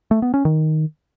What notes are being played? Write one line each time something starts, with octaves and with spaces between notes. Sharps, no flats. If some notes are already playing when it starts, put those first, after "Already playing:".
A3
B3
C#4
D#3